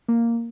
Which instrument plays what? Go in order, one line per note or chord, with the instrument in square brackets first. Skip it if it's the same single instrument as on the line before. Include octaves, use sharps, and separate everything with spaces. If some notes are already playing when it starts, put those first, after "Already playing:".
[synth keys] A#3